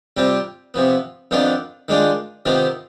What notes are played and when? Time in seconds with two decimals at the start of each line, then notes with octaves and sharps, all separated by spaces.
0.17 C3 G3 C4 F4
0.74 C3 F3 B3
1.31 F2 D#3 B3 D4 F4
1.88 D#3 G#3 D4 F4
2.46 C3 D#3 B3 F4